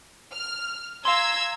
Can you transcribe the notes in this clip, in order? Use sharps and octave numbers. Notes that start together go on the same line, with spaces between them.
F6
F5 A#5 C6 E6 G#6